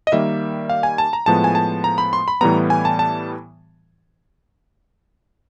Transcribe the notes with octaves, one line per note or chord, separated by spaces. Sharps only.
D#5
D#3 G3 A#3 E5
F5
G#5
A5
A#5
A2 F3 G#3 B3 A5
G#5
A5
A#5
B5
C6
B5
A2 E3 G3 B3 A#5
G#5
A5
A5